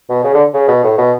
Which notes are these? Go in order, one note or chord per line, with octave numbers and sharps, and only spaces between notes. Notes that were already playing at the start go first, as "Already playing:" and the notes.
B2
C#3
D3
C#3
B2
A2
B2